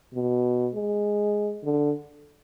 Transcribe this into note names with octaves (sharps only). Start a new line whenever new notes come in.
B2
G#3
D3